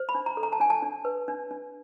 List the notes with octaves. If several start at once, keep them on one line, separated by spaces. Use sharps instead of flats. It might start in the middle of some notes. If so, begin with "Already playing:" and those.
Already playing: C5
B5
D4
A#5
A4
A#5
A5
D4 G#5
A5
D4
B4
D4
D4